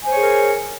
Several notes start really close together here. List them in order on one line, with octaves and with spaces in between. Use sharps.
G#5 C5 C#5 G#4 A#4